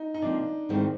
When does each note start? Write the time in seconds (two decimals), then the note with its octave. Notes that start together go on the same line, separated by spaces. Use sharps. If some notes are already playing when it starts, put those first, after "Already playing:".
Already playing: D#4
0.14 D#4
0.22 C3 F3 A#3 D4
0.69 G#2 D#3 G#3 C4 E4